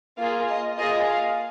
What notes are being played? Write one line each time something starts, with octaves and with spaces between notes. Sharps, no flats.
A#3 F4 G#4 F5
D#5
A#3 F4 G#4 D#5
F5